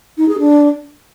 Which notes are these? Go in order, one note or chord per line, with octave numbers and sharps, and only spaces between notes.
D#4
G#4
D4